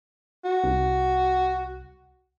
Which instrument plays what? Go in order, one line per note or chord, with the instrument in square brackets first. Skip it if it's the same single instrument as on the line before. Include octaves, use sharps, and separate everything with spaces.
[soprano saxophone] F#4
[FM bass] C2